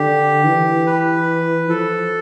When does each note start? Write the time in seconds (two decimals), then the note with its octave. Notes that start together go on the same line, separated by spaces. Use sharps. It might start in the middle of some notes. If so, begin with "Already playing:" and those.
Already playing: D3 G4
0.45 E3
0.86 B4
1.69 F3 A4